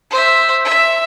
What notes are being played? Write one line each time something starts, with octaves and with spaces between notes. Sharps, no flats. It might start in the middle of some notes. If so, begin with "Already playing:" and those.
C5 E5
E5